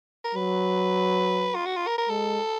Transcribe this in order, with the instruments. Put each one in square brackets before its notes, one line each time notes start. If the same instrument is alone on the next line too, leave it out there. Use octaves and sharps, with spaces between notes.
[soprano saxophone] A#4
[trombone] F#3 [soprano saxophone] B4
[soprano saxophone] F4
F#4
F4
A#4
A#4
[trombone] G#3 [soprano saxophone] A4